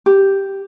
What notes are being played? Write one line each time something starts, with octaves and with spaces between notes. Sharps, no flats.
G4